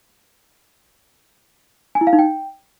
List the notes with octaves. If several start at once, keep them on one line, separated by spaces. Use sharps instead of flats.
G#5
E4
F5
D#4
G5